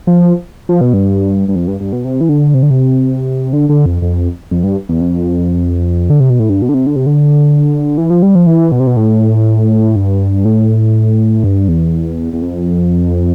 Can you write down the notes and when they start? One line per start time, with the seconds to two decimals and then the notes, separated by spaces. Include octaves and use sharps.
0.07 F3
0.69 F3
0.81 B2
0.93 G2
1.48 G2
1.55 F2
1.68 G2
1.80 G2
1.93 B2
2.05 C3
2.21 E3
2.29 D3
2.54 C3
2.63 D3
2.70 C3
3.53 D3
3.69 D3
3.86 F2
4.02 F2
4.51 F2
4.64 G2
4.89 E2
5.01 F2
6.10 D3
6.20 C3
6.30 B2
6.39 A2
6.50 G2
6.62 B2
6.69 D3
6.74 C3
6.87 D3
6.96 C3
7.06 D3
7.98 E3
8.10 F3
8.22 G3
8.35 F3
8.47 E3
8.72 B2
8.80 C3
8.87 B2
8.97 A2
9.96 G2
10.45 A2
11.44 G2
11.68 E2
12.33 E2
12.42 F2